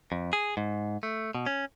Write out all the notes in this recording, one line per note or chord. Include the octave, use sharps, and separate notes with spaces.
F2
G#4
G#2
A3
B2
C#4